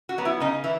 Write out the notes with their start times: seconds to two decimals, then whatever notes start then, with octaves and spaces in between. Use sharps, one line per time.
0.09 F#4
0.18 F#3 B3
0.25 E4
0.40 C#3 D#4
0.64 E3 E4